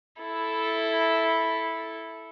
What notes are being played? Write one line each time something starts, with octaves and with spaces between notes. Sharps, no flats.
E4 A4